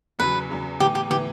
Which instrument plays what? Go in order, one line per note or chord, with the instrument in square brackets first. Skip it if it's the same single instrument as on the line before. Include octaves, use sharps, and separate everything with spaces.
[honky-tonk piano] E2 C#3 F#3 [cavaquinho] B4
[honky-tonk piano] E2 C#3 F#3
[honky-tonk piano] A2 E3 B3 [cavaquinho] G4
[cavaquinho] G4
[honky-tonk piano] A2 E3 B3 [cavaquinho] G4